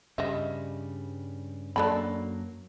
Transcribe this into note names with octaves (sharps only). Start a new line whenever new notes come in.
G2 C#3 G3 D#5 E5
F#2 F#3 A#3 D4 A4 B5